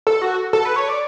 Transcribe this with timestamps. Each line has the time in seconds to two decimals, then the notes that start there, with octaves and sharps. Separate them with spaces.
0.07 A4
0.22 F#4
0.53 A4
0.65 B4
0.76 C#5
0.88 D5